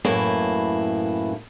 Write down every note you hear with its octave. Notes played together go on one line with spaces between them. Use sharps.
F#2 A2 E3 A#3 E4